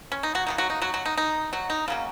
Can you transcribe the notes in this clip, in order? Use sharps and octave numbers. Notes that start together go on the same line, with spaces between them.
C#4
D#4
F#3 F#4
D#3 F#3 A#3 D#4
F#3 F#4
D#4
F#3 F#4
F#3 F#4
D#4
D#4
F#3 F#4
D#4
C#3 F#3 A#3 C#4